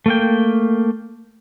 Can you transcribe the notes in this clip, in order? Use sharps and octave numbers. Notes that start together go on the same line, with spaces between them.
A3 A#3 G5